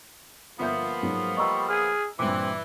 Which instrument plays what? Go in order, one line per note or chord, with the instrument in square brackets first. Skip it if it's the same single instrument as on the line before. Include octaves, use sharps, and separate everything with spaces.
[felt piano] G1 E5 G6 [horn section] F3 A#3 B3
[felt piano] G#2 F#3 G#3
[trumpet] G3 [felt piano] D#5 A#5 E6 [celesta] C#6
[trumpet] G#4 [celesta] F6
[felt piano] G2 A#2 [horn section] E3 [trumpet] C4 [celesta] D6